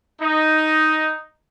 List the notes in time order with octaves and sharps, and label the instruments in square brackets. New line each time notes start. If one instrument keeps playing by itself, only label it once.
[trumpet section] D#4